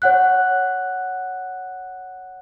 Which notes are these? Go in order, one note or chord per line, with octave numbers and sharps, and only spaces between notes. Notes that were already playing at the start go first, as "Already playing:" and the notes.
C#5 F#5 F#6